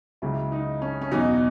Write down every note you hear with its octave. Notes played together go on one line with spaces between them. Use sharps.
C#2 C#3 F#3 E4
D#4
C#4
C#4
E2 B2 F#3 D#4